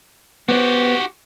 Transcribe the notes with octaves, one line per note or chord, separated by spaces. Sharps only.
B3 F#4 G4 C5